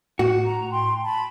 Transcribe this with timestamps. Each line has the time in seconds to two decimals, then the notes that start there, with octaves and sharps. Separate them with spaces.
0.19 A2 F#4
0.43 A#5
0.70 G5 C6
1.04 A5 B5